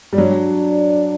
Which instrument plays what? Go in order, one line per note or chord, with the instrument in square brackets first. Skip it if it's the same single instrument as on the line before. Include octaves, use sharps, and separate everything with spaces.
[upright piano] G3
[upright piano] F#3 [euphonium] D4